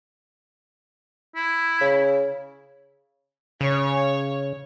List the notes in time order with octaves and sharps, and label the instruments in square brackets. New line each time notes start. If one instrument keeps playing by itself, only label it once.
[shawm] E4
[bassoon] C#3
[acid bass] C#3 [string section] C#5